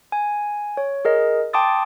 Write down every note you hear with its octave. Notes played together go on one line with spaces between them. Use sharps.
G#5
C#5
G#4 A#4 D#5
G5 A5 C6 D6 D#6 A6